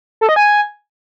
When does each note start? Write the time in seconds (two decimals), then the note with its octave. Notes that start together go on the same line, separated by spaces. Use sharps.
0.21 A4
0.29 D#5
0.36 G#5